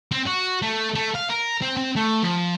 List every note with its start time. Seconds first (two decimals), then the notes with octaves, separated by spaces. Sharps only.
0.11 C4
0.27 F#4
0.62 A3
0.95 A3
1.15 F5
1.30 A#4
1.62 C4
1.77 C4
1.96 A3
2.22 F3